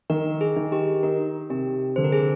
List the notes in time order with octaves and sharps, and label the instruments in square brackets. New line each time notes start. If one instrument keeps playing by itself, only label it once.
[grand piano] D#3 [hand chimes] A#4
[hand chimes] G#4
[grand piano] D#3
[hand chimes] G4
[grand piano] D#4 [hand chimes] A#4
[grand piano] C3 [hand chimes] G4
[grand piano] D3 [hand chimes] C5
[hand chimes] A#4
G#4